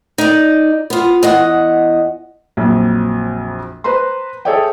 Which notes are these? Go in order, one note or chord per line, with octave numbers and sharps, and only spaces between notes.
D#4 D5
B3 F4
E2 D#5 F#5
A#1 F2 F#3
B4 C5 A#5 C6
G#4 A4 C#5 D5 E5 G5